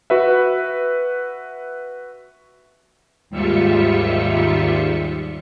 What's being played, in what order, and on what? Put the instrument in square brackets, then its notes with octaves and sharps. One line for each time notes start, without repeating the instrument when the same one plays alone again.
[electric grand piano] F#4 B4 E5
[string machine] D#2 G#2 G3 F4 E5 C#7